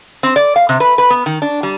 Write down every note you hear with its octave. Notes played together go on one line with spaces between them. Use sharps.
C4
D5
F5
C3
B4
B4
B3
D#3
D4
G3